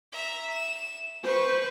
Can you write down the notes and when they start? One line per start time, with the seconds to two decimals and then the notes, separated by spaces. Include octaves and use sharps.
0.12 E5 A#5
0.51 E7
1.23 B4 C5 C#6